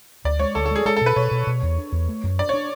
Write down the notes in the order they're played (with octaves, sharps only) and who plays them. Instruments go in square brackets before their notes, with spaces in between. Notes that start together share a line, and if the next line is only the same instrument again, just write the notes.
[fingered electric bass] D2 [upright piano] D5
[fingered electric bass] G#3 [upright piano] C#5
[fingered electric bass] D2 [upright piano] A4
[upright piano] A4
[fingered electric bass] G#3 [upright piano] G#4
[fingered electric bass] G#3 [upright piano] A4
[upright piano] A4
[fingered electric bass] B2
[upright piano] B4
[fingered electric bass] B2 [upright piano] C#5
[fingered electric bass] B2
B2
E2
D4
E2
A3
F#2
[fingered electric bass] D4 [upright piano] D5
[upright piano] C#5
[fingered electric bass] D4